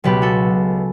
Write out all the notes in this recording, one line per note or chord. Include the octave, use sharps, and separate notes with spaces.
C#2 B2 F#3 B3 G4 B4
F#4 A4